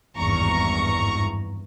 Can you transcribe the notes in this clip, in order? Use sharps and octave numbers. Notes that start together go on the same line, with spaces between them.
G#1 E2 G2 A#5 C#6